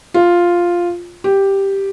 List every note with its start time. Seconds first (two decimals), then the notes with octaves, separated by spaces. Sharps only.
0.14 F4
1.24 G4